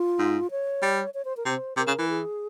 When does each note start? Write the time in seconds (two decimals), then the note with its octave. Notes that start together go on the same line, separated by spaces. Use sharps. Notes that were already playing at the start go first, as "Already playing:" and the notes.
Already playing: F4
0.19 G#2
0.51 C#5
0.82 G3
1.14 C#5
1.25 C5
1.37 A#4
1.46 C3 C5
1.77 C3 A#4
1.87 C#3
1.98 E3
2.09 G#4